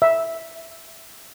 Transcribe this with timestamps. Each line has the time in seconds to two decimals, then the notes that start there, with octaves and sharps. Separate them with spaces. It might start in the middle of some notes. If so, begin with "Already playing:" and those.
0.02 E5